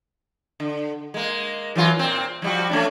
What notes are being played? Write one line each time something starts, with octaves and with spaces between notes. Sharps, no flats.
D3
G#3 A#3
E3 F#3 F4
A#2 C4
F3 G3 F#4
A3 C#4 D4